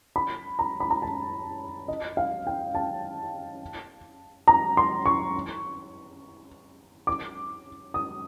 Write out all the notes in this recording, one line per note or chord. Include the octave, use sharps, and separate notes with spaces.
B5
A#5
B5
A#5
A5
D#5
F5
G5
A5
A#5
C6
C#6
D6
D#6